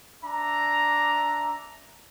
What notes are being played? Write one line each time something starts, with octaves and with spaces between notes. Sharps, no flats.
D4 E5 A#5